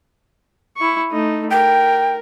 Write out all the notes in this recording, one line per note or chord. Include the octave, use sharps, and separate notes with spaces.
E4 C#6
A3 D#4
A#4 G5